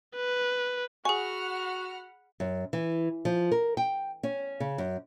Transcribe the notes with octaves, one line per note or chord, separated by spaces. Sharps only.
B4
F#4 G#4 F#5 G#5 B5 C#6 F6
F#2
E3
F3
A#4
G5
C#4
C#3
F#2